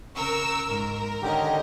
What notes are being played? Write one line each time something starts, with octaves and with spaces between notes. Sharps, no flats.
C#3 A#4 C#6 E6
G#2 A#4
D3 D#3 C#4 G4 D#5